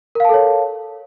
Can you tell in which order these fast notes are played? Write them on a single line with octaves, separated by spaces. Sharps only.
A#4 F5 A5 A4 C#5